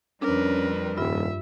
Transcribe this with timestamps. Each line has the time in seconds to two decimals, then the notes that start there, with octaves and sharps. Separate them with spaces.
0.22 F2 G3 C#4 D4 A#4 B4
0.97 D#1 G2 F4 E5